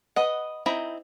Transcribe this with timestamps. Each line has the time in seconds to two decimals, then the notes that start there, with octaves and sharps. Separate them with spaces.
0.16 B4 D#5 F#5
0.66 C4 D#4 E4 A#5 B5